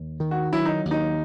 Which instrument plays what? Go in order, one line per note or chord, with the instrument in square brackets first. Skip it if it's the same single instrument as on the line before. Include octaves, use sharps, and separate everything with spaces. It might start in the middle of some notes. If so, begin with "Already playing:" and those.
Already playing: [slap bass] D#2
D#3
[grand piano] F#4
[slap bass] F#3 [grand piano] E4
[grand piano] D#4
[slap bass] D#2
[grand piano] D#4